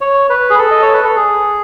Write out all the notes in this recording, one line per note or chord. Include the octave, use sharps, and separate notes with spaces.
C#5
B4
G#4
A4
D#5
C#5
B4
A4
G#4